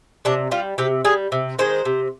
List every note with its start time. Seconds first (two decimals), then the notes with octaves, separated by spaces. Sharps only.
0.25 C3 D4
0.51 G3 F4
0.78 C3 G4
1.05 G3 G#4
1.32 C3
1.59 D#3 G#3 C5
1.85 C3